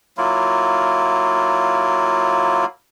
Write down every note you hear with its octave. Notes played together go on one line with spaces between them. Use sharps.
F#3 A#3 E4 F4